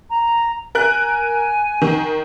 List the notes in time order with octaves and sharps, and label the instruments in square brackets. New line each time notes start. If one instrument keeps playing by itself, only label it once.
[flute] A#5
[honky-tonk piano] A#4 F#6 [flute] G#5
[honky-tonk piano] D#3